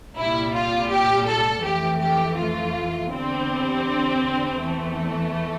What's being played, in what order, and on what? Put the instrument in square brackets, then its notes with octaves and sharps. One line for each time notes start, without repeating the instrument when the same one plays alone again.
[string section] C2 A#2 G3 E4
F4
G4
A4
F2 E3 A3 G4
G4
F4
E2 D3 G3 C4
E2 E3 A3